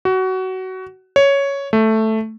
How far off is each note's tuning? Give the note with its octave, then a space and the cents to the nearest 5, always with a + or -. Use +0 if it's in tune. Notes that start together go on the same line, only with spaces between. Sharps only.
F#4 +20
C#5 +5
A3 +0